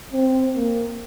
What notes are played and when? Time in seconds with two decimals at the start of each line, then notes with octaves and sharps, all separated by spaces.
0.13 C4
0.56 A#3